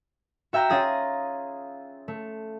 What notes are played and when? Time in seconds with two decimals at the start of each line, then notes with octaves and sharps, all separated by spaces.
0.53 F#4 E5 G5 A#5 E6
0.69 C#4 F4 G#4 D#6 A#6
2.08 A3